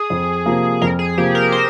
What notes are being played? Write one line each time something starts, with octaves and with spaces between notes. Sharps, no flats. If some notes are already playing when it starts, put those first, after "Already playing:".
Already playing: G#4
F2
C3 F3 A#3
F2 A#4
G#4
C3 F3 A#3 G4
A#4
C5